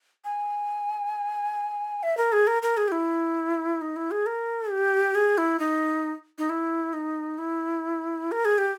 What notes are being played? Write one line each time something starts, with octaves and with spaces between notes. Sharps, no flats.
G#5
E5
A#4
G#4
A#4
A#4
G#4
G4
E4
D#4
E4
G#4
A#4
G4
G#4
E4
D#4
D#4
E4
D#4
E4
A#4
G#4
G4